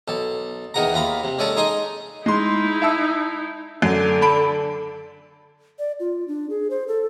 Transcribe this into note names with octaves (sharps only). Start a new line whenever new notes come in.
B1 A4
E2 D#3 G#4 F#5 A#5
D#2 F4 A#5 B5
C3
G#3 C#4 G#4 A4 D5
D#4 G#4 G#5 C6 D#6
G#3 D#4 E4 C6
E5 A5 E6
F#2 D3
A5 B5 D7
D5
F4
D4
G#4
C5
A4